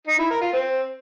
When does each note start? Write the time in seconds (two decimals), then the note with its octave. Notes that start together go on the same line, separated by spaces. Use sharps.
0.07 D#4
0.18 E4
0.30 A#4
0.41 F4
0.53 C4